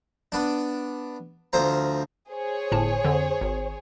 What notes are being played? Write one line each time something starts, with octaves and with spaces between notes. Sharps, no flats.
B3 D4
D2 F3 C5 A#5
G#4 C5 C#5
G1 A2 A5
F2 D3
G#1